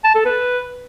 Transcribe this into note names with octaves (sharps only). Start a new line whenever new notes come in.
A5
A4
B4